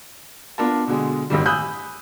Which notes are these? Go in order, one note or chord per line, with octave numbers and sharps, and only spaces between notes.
B3 D4 F4 A#4 A5
B2 D3 G#3
A1 G2 D#3 G3
G#5 B5 D#6 E6 F#6 G6